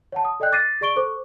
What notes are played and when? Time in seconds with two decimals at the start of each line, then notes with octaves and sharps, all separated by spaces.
0.12 C#5 F#5 A5
0.25 D#6
0.40 A4 D5 D#5 G5 F#6 G6
0.52 D6 A6 A#6 C7 D#7
0.81 G#4 D5 C#6 D7 G7
0.96 A4 C5 C#6 D6